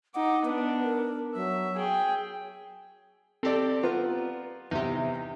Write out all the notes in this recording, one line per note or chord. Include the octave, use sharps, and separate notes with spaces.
D#4 F#5 D6
B3 D4 B4
A#4
F#3 E5
G#4 G5
C4 G4 A4 D5
B3 F4 A#5
E2 C3 D#4 G4